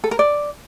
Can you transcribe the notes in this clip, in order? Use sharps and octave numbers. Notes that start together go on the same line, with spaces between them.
A4
A#4
D5